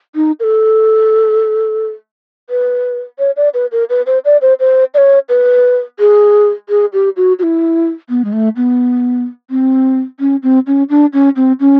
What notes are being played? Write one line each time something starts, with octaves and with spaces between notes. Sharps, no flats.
D#4
A#4
A4
B4
C#5
D5
B4
A#4
B4
C5
D5
C5
C5
D5
C#5
B4
G#4
G#4
G4
F#4
F#4
E4
B3
G#3
A3
B3
C4
C#4
C4
C#4
D4
C#4
C4
C#4